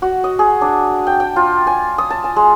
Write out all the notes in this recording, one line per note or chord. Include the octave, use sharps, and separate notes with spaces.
F#4
D#5
G#4
D4
G5
G5
F4
G#5
D#6
A5
G#5
G#3